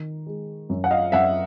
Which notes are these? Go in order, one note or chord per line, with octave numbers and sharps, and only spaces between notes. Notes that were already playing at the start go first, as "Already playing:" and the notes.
Already playing: D#3
G#3
F#2
F#5
D#5 F5
F#2 E5 F#5